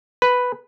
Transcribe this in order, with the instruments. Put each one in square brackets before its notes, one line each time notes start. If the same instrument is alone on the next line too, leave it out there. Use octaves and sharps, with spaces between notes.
[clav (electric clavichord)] B4